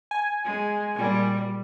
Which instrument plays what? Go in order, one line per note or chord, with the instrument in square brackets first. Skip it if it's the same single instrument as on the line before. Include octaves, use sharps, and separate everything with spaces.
[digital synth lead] G#5
[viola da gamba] G#3
A#2 G3